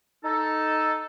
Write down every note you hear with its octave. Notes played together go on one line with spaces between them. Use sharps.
D#4 A4